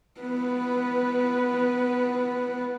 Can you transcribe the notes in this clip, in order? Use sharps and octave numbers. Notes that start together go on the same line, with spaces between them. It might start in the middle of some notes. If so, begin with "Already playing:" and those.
B3 B4